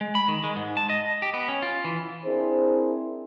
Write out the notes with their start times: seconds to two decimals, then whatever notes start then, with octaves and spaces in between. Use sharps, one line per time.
0.01 G#3
0.15 B5
0.28 D#3
0.44 G#3
0.56 G#2
0.77 A5
0.90 D#5
1.22 G4
1.34 B3
1.48 C#4
1.62 F4
1.85 E3
2.25 C4 D4 E4 G#4 A#4 C5